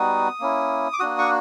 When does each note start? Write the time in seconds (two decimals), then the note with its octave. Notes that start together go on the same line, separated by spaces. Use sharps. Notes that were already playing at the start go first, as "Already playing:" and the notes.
Already playing: G3 B3 D#4 F#4 D#6
0.40 A#3 C#4 E4
0.93 D6
1.00 A#3 D4 F#4 D#6
1.18 C#6